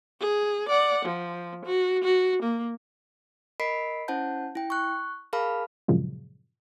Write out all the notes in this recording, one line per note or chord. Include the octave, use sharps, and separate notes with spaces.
G#4
D5 F#5
F3
F#4
F#4
A#3
A#4 D#5 B5 B6 C7 D7
C#4 E4 C5 F#5 A5 G6
E4 G5
C#6 F#6
G#4 A#4 F5 A5 B5 F6
G2 A#2 C#3 F3 F#3 G#3